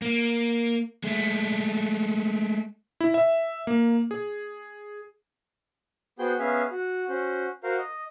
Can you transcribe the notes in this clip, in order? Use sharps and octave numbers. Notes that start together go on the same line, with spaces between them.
A#3
G#3 A3
E4
E5
A#3
G#4
B3 F#4 G#4 C5 G5 G6
B3 C#4 G#4 E5 F5 G#5
F#4
C#4 F#4 C5
F#4 A#4 C5 F5
D#5